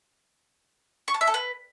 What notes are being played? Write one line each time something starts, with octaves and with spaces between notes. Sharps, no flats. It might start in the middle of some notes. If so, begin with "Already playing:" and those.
C#6
A5
E5
A4
B4